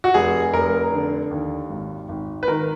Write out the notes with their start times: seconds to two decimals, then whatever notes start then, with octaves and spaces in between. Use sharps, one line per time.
0.04 F#4
0.14 F1 G#4
0.54 F1 A#4
0.92 D3
1.31 D#2
1.70 G#1
2.09 G#1
2.43 B4
2.48 D#3 A#4